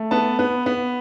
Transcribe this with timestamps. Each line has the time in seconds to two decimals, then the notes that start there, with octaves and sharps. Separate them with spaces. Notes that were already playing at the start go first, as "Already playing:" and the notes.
Already playing: A3
0.11 B3 A5
0.39 B3
0.66 B3